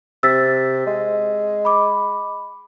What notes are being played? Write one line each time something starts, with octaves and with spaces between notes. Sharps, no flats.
C3 E6 A6 B6
G#3
B5 D6